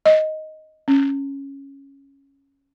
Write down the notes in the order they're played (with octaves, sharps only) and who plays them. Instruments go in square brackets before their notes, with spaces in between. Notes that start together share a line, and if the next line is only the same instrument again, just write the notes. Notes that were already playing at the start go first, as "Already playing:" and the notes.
[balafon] D#5
C#4